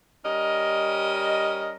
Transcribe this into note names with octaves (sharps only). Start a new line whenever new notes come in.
G3 C#4 A#4 D#5